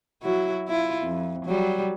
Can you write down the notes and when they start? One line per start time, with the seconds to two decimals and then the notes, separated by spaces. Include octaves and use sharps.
0.23 F#3 E4 F#4
0.68 E4 F4
1.03 F2
1.45 F#3 G3